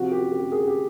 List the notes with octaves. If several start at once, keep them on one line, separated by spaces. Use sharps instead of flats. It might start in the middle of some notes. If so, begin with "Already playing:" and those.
Already playing: C3 F3 F#4
G4
G4
G#4
G4